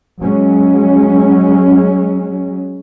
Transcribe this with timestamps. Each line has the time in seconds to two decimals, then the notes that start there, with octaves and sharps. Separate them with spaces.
0.20 F#3 G#3 C#4